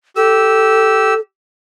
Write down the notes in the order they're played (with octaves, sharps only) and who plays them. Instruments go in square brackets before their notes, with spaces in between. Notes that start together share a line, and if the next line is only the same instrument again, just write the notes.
[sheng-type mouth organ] G4 E6 [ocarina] A4